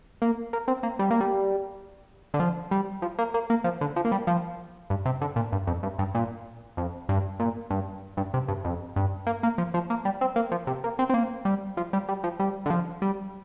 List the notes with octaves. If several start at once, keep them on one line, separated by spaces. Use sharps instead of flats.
A#3
A#3
C4
A#3
G3
A#3
G3
D3
F3
G3
F3
A#3
A#3
A#3
F3
D3
F3
A#3
G3
F3
G2
C3
D3
A#2
G2
F2
G2
G2
A#2
F2
G2
A#2
G2
G2
C3
G2
F2
G2
A#3
A#3
F3
F3
A#3
G3
C4
A#3
F3
C3
A#3
C4
C4
A#3
G3
F3
G3
G3
F3
G3
D3
F3
G3